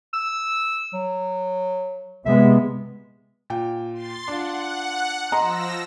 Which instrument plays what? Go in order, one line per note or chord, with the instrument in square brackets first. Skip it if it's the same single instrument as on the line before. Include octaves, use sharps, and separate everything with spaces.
[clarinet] E6
F#3
[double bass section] C3 G#3 B3 [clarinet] E5
[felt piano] A#2 G5
[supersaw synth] C6 A6
[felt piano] D4 F4 [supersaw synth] F#5
[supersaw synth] F3 E6 A#6 [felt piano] D#5 C6 [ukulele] A#5